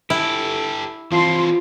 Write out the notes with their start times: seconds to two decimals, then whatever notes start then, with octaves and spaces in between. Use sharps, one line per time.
0.10 E4 G4 A4
1.12 E3 F3 C4 C6